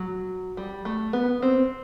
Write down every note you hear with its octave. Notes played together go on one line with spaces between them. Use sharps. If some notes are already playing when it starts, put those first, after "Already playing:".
Already playing: F#3
G3
A3
B3
C4